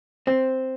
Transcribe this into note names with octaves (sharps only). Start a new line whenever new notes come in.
C4